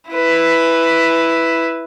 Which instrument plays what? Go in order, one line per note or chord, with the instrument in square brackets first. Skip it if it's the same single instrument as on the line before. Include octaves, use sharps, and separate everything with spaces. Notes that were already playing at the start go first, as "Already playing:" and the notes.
[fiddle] E4 B4